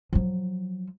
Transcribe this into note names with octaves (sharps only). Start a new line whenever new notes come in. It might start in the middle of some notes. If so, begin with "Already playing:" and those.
F3 F#3